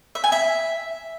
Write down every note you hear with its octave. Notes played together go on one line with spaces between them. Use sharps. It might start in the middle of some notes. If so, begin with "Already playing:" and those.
E5
G#5
E5